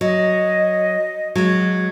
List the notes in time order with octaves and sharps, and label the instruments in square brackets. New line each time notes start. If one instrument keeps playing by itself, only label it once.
[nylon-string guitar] F#3 [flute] D#5
[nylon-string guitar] F#3 G#3